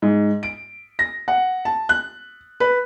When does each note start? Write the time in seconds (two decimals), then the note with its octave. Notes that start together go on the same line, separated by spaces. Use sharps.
0.02 G#2
0.43 D7
0.99 A#6
1.28 F#5
1.65 A5
1.89 F#6
2.60 B4